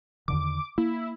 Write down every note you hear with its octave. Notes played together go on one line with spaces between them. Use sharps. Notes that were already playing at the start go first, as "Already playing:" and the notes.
E2 D3 D#3 D6
A#3 E4